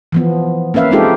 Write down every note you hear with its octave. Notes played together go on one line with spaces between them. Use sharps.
E3 F3 B3
A#3 C#4 B4 E5 F5
G#3 C4 D#4 F4 G4 A4